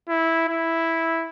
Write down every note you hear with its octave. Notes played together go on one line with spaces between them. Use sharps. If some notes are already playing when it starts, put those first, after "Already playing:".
E4
E4